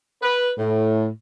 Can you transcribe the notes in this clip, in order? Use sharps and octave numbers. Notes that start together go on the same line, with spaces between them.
B4
A2